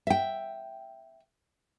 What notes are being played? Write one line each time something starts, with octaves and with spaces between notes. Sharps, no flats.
E5 G5